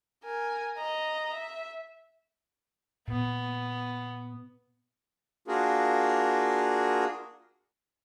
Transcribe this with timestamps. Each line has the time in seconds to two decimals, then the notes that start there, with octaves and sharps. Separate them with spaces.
0.25 A#4 G#5
0.77 D#5 A#5
1.33 E5
3.08 A#2 B3
5.48 A#3 D4 F4 F#4 G#4 A#4